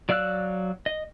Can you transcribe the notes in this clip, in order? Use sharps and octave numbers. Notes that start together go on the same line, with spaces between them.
F#3 D5 F5 E6 F#6
D#5